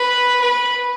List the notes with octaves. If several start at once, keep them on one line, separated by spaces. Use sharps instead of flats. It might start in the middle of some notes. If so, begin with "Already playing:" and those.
Already playing: B4
B4